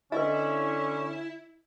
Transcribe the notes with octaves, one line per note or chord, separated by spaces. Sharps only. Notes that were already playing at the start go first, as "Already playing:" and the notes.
D3 C#4 E4 B4 D#5